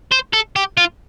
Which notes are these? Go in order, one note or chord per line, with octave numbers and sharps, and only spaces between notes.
C5
A4
G4
F4